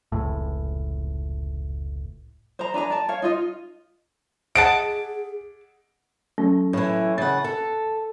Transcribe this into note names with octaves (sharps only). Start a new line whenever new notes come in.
F1 C#2 A2
C5 A#5
D4 B4 G#5 A#5
D5 A5
C#5 F5
D#4 F4 D#5
G#4 D#5 F#5 A5 D7
F#3 A3 C#4
A2 E3
C#3 F#5 A6
A4